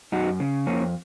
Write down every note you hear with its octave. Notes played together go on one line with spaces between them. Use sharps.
F#2 D#4 F#4
C#3
F2 A#3 C#4